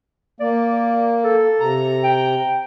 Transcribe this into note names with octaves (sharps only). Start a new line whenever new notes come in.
A#3 D5
A4
C3 A#5
G5